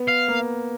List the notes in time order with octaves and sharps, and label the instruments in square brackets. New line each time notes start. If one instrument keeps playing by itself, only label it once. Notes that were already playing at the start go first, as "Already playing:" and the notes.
Already playing: [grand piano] B3
[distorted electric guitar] F5
[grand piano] A#3